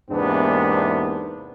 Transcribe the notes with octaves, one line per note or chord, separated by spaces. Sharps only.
E2 G#2 C3 A#3 B3 D4